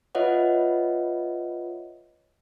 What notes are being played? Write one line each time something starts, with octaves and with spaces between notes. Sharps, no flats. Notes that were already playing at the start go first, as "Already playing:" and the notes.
F4 B4 C#5 D#5 E5 F#5